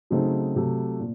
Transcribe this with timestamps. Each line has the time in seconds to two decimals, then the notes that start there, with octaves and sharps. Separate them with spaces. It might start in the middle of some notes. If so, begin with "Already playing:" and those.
0.10 C#3 F#3 A3 C4 D#4
0.56 C3 F#3 A3
0.99 A#2